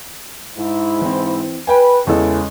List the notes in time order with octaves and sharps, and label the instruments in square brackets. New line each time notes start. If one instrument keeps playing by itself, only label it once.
[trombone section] G#2 E4
[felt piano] E3 C4
[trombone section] B4 [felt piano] G5 G#5
[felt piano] E2 E3 A4 [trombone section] C#3 G#3